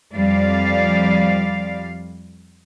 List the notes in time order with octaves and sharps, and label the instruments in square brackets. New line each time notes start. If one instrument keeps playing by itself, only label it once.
[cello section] F2 F3 G3 D5 F5